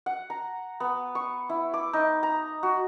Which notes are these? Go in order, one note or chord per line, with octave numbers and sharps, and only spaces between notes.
F#5
A#5
B3
C#6
E4
D6
D#4
A#5
F#4